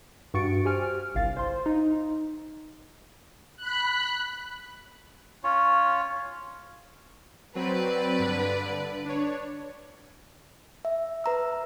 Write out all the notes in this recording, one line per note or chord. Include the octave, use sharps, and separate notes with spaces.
G2 F#4 C#6 A6 C#7 D7
G4 C5 G#5 F6
G1 C2 F5 A6
C5 C6
D#4
B5 F#6
C#4 F4 C#5
F#3 C4 B4 D5
G2 D3
D4 C#5
E5
B4 A#5 E6